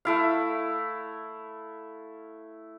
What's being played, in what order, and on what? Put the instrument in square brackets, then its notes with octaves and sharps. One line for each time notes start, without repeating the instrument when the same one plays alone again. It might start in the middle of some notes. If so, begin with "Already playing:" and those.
[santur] A3 E4 F5